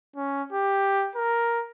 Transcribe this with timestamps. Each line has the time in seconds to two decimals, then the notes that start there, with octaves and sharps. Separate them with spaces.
0.16 C#4
0.53 G4
1.16 A#4